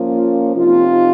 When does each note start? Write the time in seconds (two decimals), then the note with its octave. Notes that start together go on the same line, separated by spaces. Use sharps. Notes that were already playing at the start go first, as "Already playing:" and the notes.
Already playing: F3 A#3 C#4 F4
0.56 C3 F3 C4 D#4 F4